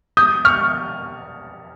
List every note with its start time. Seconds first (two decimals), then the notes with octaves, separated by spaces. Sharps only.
0.17 D#6 G6
0.45 C#6 F6